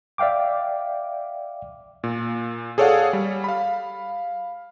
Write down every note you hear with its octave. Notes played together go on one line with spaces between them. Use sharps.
D5 E5 F5 G5 D6
A#2
G#4 A4 C#5 D5 F5 F#5
G3
F5 B5